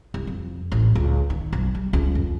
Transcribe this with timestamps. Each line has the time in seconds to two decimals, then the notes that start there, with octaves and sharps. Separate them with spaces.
0.14 C2
0.27 F2
0.72 A1
0.95 C#2
1.30 D#3
1.53 B1
1.75 G3
1.93 C#2
2.15 F2